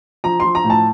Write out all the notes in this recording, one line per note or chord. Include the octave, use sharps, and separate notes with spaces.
F3 A#5
F3 C6
A#5
A2
A5